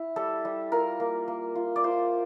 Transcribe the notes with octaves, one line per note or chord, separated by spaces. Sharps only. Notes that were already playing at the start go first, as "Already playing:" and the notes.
Already playing: E4
G3 A4
G3
F4 A#4
A#3
A#3
F4
D5
F4 C5